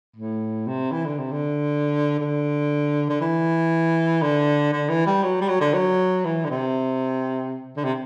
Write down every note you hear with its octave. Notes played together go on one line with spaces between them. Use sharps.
A2
C3
E3
D3
C3
D3
D3
D3
E3
D3
D3
E3
G3
F#3
G3
F#3
D3
F#3
E3
D3
C3
D3
C3